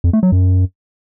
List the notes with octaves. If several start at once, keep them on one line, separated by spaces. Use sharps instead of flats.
F2
A3
F#3
F#2